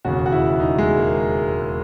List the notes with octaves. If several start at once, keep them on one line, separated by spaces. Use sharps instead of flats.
E1 D#2 C#3 F#4
F#4
E4
D#4
G#3
A#3